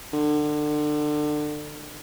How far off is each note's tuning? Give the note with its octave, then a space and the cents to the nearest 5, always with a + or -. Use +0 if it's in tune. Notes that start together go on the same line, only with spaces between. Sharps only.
D3 +30